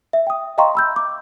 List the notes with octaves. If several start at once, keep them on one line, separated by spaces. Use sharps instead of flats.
E5
G5 D#6
D#5 F5 G5 A#5 C6 C#6
B5 E6 G6
D6